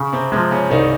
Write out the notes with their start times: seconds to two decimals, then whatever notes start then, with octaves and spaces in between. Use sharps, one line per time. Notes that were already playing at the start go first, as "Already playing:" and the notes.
Already playing: C#3
0.12 C3 C4
0.32 C3 F3 G#3 C4
0.51 C#3 C#4
0.71 C2 D#3 D#4